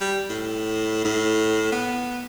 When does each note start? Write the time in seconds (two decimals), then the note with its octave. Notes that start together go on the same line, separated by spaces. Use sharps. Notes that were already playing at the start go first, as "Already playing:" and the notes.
0.01 G3
0.30 A2
1.04 A2
1.72 B3